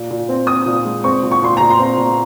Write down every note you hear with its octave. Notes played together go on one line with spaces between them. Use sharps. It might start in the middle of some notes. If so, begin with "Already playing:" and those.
Already playing: A#2
A#2
C4
C4 D#6
A#2
G#3
C4 C#6
A#2
C#6
A#2 C6
A#2 A#5
C6
C4
A#2